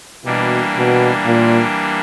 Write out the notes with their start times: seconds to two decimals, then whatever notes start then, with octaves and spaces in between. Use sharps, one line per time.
0.25 B2 E3 G3 A#3 D4
0.75 B2
1.25 A#2